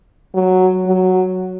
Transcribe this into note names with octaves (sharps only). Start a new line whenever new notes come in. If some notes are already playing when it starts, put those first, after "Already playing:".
F#3
F#3